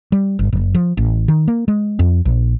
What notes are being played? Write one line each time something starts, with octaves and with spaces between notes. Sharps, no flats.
G3
G1
F#1
F3
A1
D#3
A#3
G#3
F2
A#1